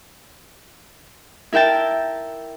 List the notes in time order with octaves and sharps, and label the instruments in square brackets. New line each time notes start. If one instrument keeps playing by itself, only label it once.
[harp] E4 A#4 E5 G5 A5